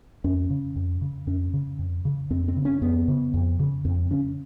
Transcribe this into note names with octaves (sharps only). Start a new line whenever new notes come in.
F2 C#4
C#3
F2
C#3
F2 C#4
C#3
F2
C#3
F2 C4
C4
C#3
C#4
F2 B3
C#3
F2
C#3
F2 C4
C#3 C#4